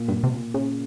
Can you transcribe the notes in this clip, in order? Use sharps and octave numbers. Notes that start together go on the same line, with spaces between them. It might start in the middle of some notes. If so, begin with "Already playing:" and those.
Already playing: A#2
G2
C3
A#2
C#3